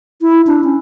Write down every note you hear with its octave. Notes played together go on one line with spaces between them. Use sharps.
E4
D4
C#4